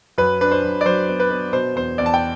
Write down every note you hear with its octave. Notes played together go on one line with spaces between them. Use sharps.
F#2 B4
D4 B4
C5
F#2
D5
F#3 C5
B3
B4
B3
B2 C5
E2 C5
E2 D5
A5
G5